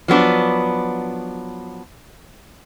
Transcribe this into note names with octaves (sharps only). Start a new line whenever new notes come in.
F3 F#3 B3 D4